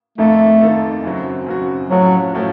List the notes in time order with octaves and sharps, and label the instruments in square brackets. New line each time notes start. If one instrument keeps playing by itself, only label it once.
[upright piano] F2 D#3 A#3 D#4 A4 [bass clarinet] A3
[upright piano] F2 D#3 A#3 D#4 A4
F#2 C#3 F#3 C4 F#4
F#2 C#3 F#3 C4 F#4
[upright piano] A2 F3 A3 C#4 F#4 [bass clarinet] F#3
[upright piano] A2 F3 A3 C#4 F#4